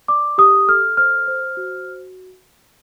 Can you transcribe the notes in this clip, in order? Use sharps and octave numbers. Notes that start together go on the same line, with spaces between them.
D5 D6
G4 D#6
A4 F6
C5 F6
C5
F#4